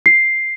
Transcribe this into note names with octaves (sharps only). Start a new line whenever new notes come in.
C7